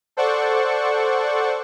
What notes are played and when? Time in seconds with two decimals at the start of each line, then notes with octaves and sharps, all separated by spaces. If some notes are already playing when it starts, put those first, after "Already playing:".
0.17 A4 C5 D5 F#5 C#6